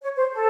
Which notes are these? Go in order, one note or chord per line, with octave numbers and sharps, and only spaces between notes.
C#5
C5
A4